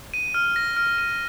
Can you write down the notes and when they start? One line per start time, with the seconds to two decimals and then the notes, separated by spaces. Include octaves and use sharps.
0.14 D#7
0.34 F6
0.56 A#6
0.76 F6
0.98 D#7